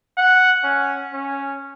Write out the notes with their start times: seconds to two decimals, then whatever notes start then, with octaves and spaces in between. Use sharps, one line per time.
0.17 F#5
0.64 C#4
1.13 C#4